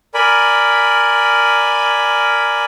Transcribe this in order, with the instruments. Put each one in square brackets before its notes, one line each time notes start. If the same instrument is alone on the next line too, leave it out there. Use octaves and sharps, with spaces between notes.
[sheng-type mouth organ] A#4 D5 G#5 B5